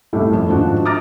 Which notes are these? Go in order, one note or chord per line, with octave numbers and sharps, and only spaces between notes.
C2 A2 G3 A3
F2
G#2 D#3 F3 D4 F#4
A#5 D6 D#6 F6 A6 A#6